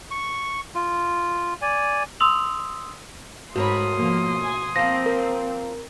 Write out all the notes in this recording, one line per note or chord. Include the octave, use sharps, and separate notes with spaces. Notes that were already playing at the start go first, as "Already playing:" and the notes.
C#6
F4
D5 G#5
C6 D#6 E6 F7 F#7
G#2 A3 F#4 A#4 C#5 B5 C6 D#6
B2 F3 A#3
G#5
F3 A#3 C4 A#6
A#4